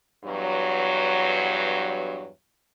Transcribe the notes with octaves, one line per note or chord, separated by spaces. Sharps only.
E2 G2 F#3